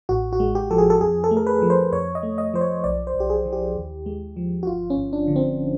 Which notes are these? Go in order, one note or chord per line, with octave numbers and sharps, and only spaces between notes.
A1 F#4
F#4
G#3
G4
F3 A4
G#4
A4
F2 G#4
A4
A3
A#4
B4
F3
C5
F2 C#5
D#5
A3
D#5
F3 C5
C#5
B1 D5
C5
B1
G4
G#4
E3
G4
D#2
G#3
F3
F#4
G1 F4
C#4
G1
D4
D3
C4